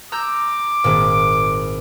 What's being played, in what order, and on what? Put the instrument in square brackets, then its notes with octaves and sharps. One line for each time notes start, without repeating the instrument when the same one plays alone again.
[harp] A#5 E6 G6 [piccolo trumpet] D6
[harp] G#1 A#2